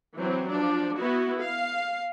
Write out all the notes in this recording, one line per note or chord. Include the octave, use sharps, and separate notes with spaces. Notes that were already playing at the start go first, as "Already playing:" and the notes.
E3 F#3 C4
F3 D4
B3 E4 F#4
F5